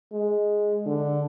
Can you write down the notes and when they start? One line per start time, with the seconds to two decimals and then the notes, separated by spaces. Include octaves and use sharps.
0.12 G#3
0.86 D3